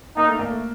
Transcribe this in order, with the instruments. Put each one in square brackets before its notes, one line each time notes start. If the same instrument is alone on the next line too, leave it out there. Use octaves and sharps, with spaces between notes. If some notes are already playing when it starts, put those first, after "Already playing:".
[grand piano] A#3 [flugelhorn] D#4
[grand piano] A3
A#3
A3